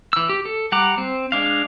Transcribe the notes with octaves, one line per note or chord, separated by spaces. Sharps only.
E3 E6
G4
A4
G3 F#5 A#5 D6
C4
G#3 D4 F5